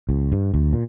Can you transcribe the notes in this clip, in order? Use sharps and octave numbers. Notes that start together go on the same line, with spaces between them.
C#2
G2
D2
A#2